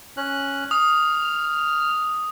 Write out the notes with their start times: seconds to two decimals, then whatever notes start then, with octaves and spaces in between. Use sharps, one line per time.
0.17 C#4 F#6
0.71 D#6 F6